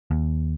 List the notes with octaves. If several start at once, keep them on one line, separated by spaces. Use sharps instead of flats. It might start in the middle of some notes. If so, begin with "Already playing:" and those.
D#2